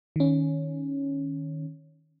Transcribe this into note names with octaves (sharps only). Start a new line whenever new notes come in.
D#3 C#4